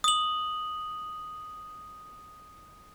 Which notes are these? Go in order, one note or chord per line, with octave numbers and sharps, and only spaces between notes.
D#6 F#7